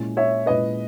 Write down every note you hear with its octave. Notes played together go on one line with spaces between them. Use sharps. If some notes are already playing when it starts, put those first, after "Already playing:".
Already playing: A#2 G#3 C#4 E4
C#5 E5
A#2 G#3 C#4 E4 B4 D#5